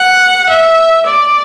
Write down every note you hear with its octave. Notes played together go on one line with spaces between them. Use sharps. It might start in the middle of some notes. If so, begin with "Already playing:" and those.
Already playing: F#5
E5
D5